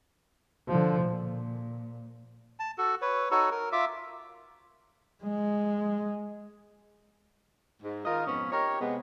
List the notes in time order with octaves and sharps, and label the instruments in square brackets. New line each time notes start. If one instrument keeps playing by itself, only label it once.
[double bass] D3 F3
A#2
[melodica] A5
F#4 A4
B4 C#5
D#4 F#4 A4 C#5
A#4
F4 E5 D6
[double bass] G#3
[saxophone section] G#2
D#3 F4 A#4 D#5 F5
F2 G#2 B3 C#4
D#4 G4 A#4 C#5
C3 G#3 B3